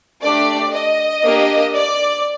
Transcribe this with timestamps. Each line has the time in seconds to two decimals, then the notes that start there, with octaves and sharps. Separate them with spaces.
0.22 A3 D4 G4 D5
0.73 D#5
1.23 A#3 D4 G4
1.74 D5